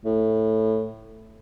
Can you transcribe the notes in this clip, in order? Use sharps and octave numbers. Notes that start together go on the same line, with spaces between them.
A2